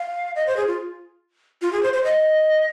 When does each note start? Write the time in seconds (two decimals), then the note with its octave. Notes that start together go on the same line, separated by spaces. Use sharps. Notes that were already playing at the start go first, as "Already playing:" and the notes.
Already playing: F5
0.36 D#5
0.47 C5
0.57 G#4
0.67 F4
1.62 F4
1.73 G#4
1.83 C5
1.93 C5
2.04 D#5